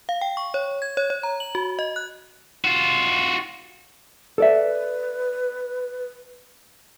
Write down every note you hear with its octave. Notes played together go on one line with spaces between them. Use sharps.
F5
G5
C#6
C#5
G#6
C#5
C#5
A#5
F#7
F#4
D#5
F#6
F4 F#4
A4 B4 D5 E5